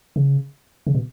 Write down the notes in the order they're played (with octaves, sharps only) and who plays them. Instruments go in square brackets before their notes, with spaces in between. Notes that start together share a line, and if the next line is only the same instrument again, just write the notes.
[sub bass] C#3
C#3
B2